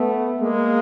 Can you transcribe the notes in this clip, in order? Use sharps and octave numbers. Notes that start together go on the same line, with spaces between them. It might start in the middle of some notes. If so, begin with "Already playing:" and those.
Already playing: A3 B3
G#3 A#3